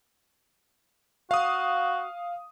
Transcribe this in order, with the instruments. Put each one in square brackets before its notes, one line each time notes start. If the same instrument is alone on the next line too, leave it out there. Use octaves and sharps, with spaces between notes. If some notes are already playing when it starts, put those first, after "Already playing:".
[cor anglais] F#4 [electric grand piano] F5 D#6